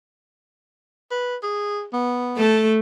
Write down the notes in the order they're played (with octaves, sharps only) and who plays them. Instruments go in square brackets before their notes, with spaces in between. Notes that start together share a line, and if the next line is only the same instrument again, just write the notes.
[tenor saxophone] B4
G#4
B3
[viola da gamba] A3 A4